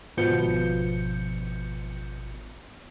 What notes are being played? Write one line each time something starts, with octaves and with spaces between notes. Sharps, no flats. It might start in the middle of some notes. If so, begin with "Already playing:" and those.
G#1 B2 F3 B3 G6 C#7